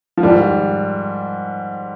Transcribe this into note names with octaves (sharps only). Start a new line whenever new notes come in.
F3
G#2 D#3 G3